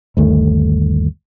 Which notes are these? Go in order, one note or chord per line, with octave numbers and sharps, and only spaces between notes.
G1 D#2 A3